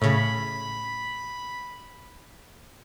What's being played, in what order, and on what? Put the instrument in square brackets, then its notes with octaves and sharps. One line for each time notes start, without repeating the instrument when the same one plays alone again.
[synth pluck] A2 C#3 [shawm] B5